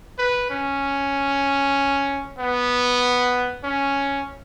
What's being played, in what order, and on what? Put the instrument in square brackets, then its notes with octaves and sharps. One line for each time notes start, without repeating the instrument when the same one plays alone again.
[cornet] B4
C#4
B3
C#4